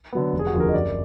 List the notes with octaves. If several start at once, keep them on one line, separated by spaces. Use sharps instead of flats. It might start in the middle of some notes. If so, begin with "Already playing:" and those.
D3 F#3 B3
F1
G#4
F#4
D#2 D3 F3
A#4
D#5
F#1 D5